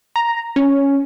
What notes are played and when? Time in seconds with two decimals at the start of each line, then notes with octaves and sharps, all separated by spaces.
0.16 A#5
0.56 C#4